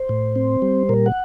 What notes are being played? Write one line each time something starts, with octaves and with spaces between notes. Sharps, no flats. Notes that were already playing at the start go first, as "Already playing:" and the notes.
Already playing: C5
A2
C4
G3
A#2 A#4
F#5